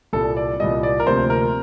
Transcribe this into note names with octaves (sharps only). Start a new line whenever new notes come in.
C2 A#2 G3 A4
D5
C2 A#2 G3 D#5
D5
A#4
D2 C3 F3 A#3 C5
A#4